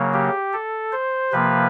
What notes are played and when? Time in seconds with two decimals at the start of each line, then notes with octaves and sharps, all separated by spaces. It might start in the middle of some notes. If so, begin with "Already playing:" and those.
Already playing: C#3 F#3 A#3
0.13 G4
0.53 A4
0.92 C5
1.32 C3 F3 A#3 B4